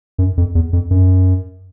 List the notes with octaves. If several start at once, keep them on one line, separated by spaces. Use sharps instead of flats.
F#2
F2
E2
F2
F#2